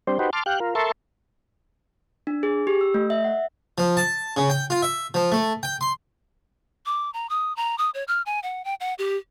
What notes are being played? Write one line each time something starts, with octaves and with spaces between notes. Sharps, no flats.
G3 C4 D4 C5
D#4 F#4 G4 B4 C5
A5 C6 D6 F6
G4 F5 G5 F#6
F4 A#4
A4 A#4 E5 A5 C6 C#6
D4
G#4
G4
E6
A3
E5
F#5
F3
A5
C#3
G5
F4
E5
F3
A3
G5
C6
D6
A#5
D#6
A#5
D#6
C#5
F6
G#5
F#5
G5
F#5
G4